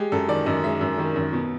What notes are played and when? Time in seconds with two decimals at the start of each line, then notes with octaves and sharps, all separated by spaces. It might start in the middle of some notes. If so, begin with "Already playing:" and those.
Already playing: G#3 G4
0.12 F#2 A4
0.28 D#3 D5
0.46 F#2 D#5
0.63 G#3 E5
0.81 F#2
0.98 D#3
1.16 F#2
1.33 B2